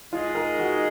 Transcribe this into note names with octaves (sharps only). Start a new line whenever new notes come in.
G#3 D#4 F4 G#4 D#5
A#4
F#4